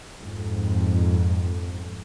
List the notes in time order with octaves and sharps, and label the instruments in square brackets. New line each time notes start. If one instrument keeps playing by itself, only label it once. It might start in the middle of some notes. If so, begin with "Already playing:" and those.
[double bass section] F2 G#2